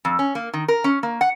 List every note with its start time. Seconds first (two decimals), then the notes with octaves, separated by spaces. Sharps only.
0.05 F2
0.19 C#4
0.35 A#3
0.53 D#3
0.68 A#4
0.84 C#4
1.03 A#3
1.21 F#5